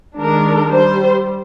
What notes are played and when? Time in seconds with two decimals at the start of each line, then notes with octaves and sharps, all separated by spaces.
0.20 D#3 G#3 D4 A#4
0.72 G3 C5